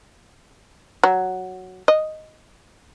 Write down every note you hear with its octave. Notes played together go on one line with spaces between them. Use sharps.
F#3
D#5